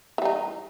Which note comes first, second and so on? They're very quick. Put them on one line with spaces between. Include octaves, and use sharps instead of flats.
E3 G3 D#4